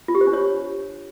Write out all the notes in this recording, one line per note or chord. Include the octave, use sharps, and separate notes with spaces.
F4
G4
C5
D4
C#5